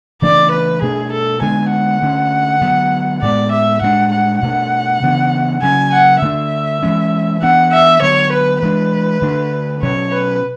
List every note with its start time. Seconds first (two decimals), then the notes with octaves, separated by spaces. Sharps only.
0.22 C#3 E3 A3 D4 D5
0.51 B4
0.82 B2 A3 D4 G#4
1.12 A4
1.41 D3 G#3 B3 D4 G#5
1.71 F#5
2.02 D3 A3 C#4
2.61 D3 F#3 B3
3.22 A2 G#3 B3 D5
3.52 E5
3.81 A2 G#3 B3 D4 F#5
4.12 F#5
4.41 B2 A3 D4 F#5
5.02 C#3 E3 B3 D4
5.62 C#3 F#3 C#4 G#5
5.92 F#5
6.22 D3 A3 D4 E5
6.83 E3 G#3 C#4
7.42 E3 B3 D4 F#5
7.72 E5
8.02 D3 F#3 B3 C#5
8.32 B4
8.62 E3 G#3 D4 B4
9.22 D3 A3 D4
9.82 B2 F#3 C#4 C#5
10.12 B4